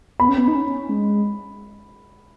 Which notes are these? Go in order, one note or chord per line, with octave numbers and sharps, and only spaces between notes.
B3 B5
C#4
B3
D#4
C#4
G#3